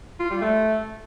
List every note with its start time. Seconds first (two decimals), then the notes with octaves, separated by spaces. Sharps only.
0.20 F4
0.31 G3
0.41 A3